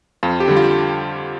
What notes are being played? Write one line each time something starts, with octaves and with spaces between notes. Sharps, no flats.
F2 F4
G4
D3 G3
F4